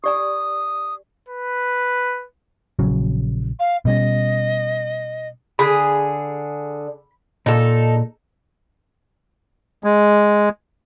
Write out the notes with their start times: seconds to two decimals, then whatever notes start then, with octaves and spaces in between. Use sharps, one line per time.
0.04 G4 D5 G#5 D#6
1.29 B4
2.79 A#1 C#3 F#3
3.59 F5
3.85 B2 G3 C#4 D#5
5.59 D3 G#4 B5
7.46 A#2 D#4 A4
9.84 G#3